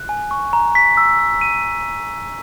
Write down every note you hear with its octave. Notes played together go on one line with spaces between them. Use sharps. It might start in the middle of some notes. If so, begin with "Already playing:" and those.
Already playing: F#6
G#5
C#6
A#5
B6
E6
E6
D#7
D#7